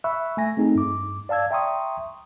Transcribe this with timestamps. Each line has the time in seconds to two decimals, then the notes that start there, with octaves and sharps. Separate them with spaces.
0.04 E5 B5 C#6 E6 F#6
0.37 A3 G#5 A#6
0.57 A3 C4 D#4 G#4
0.75 G2 D6
1.29 D5 F5 A5 E6 G#6
1.51 E5 G5 A#5 C6 C#6 D#6